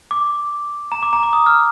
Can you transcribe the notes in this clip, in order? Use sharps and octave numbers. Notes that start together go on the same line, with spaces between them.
D6
A#5
D6
A#5
D6
D#6
F6